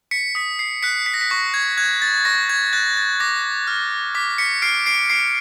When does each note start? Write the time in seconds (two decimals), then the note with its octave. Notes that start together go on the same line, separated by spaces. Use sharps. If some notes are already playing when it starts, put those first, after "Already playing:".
0.11 B6 C#7
0.35 D#6 B6
0.59 C7
0.82 F#6 B6 C#7
1.06 B6
1.14 A#6
1.21 B6
1.31 C#6 A#6
1.54 G#6
1.77 F#6 G#6
2.02 A6
2.25 C#6 A#6
2.49 G#6
2.73 F#6 A6
2.97 A6
3.20 D6 A#6
3.67 F6
4.15 D6 B6
4.38 B6 C#7
4.62 F6 C7 D7
4.86 C7 D7
5.10 D6 C7 D7